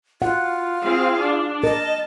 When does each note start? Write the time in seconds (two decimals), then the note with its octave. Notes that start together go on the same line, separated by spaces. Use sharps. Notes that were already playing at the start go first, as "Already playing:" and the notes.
0.22 F4 F#5
0.84 C4 G#4 F5
1.20 D4
1.64 A#4 D#5 A5